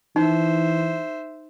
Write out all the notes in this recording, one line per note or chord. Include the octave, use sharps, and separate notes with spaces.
E3 D#4 C5 E5